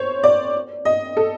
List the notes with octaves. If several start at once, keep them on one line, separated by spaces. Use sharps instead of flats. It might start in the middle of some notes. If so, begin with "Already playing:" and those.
Already playing: C5 C#5
D5
D#5
A4